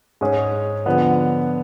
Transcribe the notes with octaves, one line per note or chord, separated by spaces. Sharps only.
G#2 G#3 C#4 G#4
D3 F3 B3